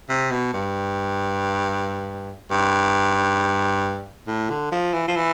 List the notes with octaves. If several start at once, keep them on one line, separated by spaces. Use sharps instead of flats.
C3
B2
G2
G2
A2
D3
F3
E3
F3
E3